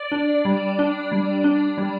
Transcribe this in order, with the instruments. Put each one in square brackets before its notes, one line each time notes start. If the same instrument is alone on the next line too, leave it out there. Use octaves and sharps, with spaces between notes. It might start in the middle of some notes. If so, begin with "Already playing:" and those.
Already playing: [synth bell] D5
D4
G3
D4
G3
D4
G3